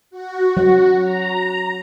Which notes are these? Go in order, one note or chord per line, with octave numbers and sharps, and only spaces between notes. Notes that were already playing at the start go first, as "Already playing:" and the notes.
F#4
F#3
A#5